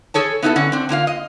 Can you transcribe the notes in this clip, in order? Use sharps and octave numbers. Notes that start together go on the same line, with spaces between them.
G#4 A4 C#5 A5
B3 D#4 E4 F#4 G4 A4
D3 C#4 F#5
C4 D4
D3 A#3 F4 F5
D#5